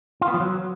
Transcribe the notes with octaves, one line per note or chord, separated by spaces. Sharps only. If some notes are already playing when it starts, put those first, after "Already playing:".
F4
B3
F3
F#3